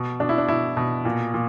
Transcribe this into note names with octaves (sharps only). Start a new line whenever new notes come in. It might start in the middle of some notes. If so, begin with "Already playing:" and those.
Already playing: B2
B2 D4
E4
D4
B2 E4
B2
A#2
A#2